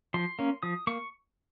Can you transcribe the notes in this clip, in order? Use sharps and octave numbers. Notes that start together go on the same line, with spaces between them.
F3 C6
A#3 C#4
F3 D#6
A#3 C#6